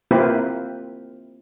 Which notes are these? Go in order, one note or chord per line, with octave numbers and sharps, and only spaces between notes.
A#3 C4 E4 F4 G4 B4